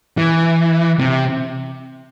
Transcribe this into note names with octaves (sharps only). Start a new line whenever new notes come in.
E3
C3